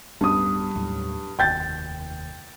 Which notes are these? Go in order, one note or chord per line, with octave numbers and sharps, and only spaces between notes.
D1 G2 B3 D#6
D#2 A2 F#3
F1 D#2 G5 G6 A6